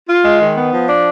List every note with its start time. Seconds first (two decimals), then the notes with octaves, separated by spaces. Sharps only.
0.09 F4
0.25 G#3
0.40 D#3
0.56 B3
0.72 F3
0.88 D4